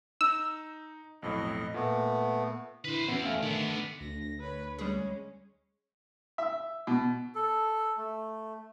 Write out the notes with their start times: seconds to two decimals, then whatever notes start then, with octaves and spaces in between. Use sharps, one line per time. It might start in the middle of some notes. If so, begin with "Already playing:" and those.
0.21 D#4 E6
1.22 B1 F2 A2 D#5
1.74 A#2 A3 B3
2.84 D3 E4 B4 C5
3.08 E2 B3 C#4 F#4
3.24 A3 E5 F5 G#5
3.43 D3 D#3 B3
4.01 D2 A#6
4.40 B4 C#5 B5
4.79 G3 G#3 C#4 G#4
6.38 E5
6.87 B2
7.35 A4
7.97 A3